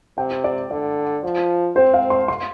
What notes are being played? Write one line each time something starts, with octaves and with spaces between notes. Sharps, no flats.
C3 G5
D5
D3 D5
F3
C4 C5
F5
C6
C6